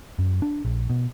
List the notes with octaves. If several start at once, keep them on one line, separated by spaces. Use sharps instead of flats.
F#2
D4
A#1
B2